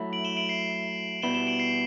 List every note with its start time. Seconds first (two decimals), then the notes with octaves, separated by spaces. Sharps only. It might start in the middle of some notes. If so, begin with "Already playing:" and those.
Already playing: F#3 A3 E4
0.13 D7 F#7
0.25 E7 G7
0.37 D7 F#7
0.49 C7 E7
1.22 B2 G3 B3 E4 E7 G7
1.35 E7 G7
1.47 D7 F#7
1.59 C7 E7